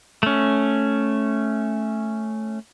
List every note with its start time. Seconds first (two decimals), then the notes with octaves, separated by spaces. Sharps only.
0.23 A3 C#4